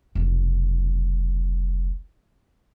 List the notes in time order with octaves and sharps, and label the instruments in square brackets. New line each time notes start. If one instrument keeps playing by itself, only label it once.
[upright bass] F1 B1